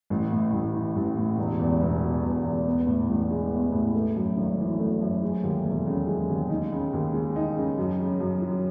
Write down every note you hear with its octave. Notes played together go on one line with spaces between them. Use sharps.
A1
A2
A1
E3
A1
A2
E1
E2
E1
B2
E1
E2
B3
A2
A1
G#3
B3
A2
A3
F#2
G#1
E3
A3
F#2
G#3
D#2
E1
C#3
G#3
D#2
D#4
C#3
D#2
G#3
D#4
C#3
F#2
C#3
F#2
F#3